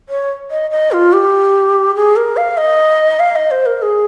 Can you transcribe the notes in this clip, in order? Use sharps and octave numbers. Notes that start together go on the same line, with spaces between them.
C#5
D#5
D#5
F4
G4
G#4
A#4
F5
D#5
F5
D#5
C5
A#4
G#4